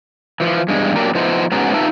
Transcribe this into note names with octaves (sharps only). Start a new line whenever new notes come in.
E3 F3
E2 G2 G#3
F#3 A#3 D4 G4 A#4
F3 B3 D#4 E4 C5
G#2 B3 C#4 F#4 G#4 A#5
D#4 F4 G4 B4 E5 A5